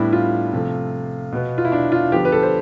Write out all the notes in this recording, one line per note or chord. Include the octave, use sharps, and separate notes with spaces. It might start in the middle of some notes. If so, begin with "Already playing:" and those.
Already playing: A2 G3 B3 D4 E4
F4
C3 F3 A3
B2 B3
F4
E4
D4
F4
D3 F3 B3 G4
B4
A4
C5